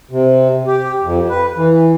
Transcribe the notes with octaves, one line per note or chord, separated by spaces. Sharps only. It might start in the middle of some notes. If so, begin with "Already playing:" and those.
C3
G4
F2
B4
E3